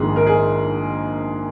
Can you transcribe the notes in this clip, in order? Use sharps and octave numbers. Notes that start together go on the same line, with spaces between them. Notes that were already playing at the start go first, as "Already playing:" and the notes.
Already playing: A#1 G#2 D#3 G#3 G#4
A#4
G#4